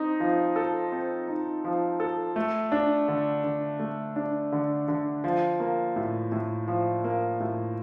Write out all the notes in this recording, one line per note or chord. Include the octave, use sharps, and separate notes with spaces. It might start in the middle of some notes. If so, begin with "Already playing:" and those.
Already playing: C4 D#4
F3
A4
C4
D#4
F3
A4
A3
D4
D3
D3
A3
D4
D3
D3
F3
A#3
A2
A2
F3
A#3
A2